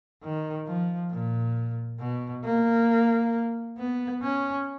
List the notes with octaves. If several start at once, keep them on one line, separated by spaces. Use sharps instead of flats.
D#3
F3
A#2
B2
A#3
B3
C#4